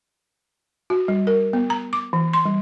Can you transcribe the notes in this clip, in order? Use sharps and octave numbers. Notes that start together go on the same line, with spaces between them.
F#4
G3
A#4
B3
A#5
D6
E3
C6
G3